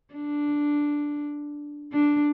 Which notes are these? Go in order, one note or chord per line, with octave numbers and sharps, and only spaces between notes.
D4
D4